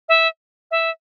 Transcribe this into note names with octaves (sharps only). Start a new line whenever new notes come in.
E5
E5